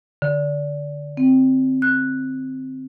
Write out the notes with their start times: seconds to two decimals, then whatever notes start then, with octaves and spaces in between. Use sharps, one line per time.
0.22 D3
1.17 C4
1.82 F#6